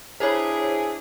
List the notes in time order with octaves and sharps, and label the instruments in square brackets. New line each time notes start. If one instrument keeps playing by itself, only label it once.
[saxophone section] D4 E4 G#4 [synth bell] C5 C#5